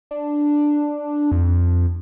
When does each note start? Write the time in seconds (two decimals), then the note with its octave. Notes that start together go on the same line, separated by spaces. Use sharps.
0.11 D4
1.32 F2